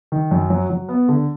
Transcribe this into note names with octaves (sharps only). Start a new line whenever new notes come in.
D#3
F#2
F#3
F#3
B3
D3